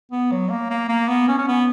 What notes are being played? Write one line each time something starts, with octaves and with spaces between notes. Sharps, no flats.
B3
F#3
A#3
A#3
A#3
B3
C#4
C#4
B3